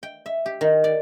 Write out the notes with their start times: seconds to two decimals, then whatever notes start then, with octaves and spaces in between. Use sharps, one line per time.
0.03 G5
0.26 E5
0.46 G4
0.61 D#3
0.84 D5